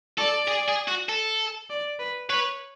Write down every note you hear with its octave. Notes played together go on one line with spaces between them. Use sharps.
A4 D5
G#4
G#4
F#4
A4
D5
B4
B4 C#5